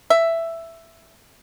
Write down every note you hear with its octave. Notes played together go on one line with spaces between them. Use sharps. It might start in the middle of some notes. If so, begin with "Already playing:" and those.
E5